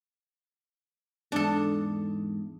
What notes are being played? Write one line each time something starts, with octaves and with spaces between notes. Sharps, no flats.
E2 G#2 D4 A4